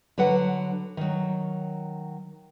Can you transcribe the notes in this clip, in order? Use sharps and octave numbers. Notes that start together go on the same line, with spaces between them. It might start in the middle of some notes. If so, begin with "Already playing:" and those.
D3 F#3 B4 F#5
D#3 F#3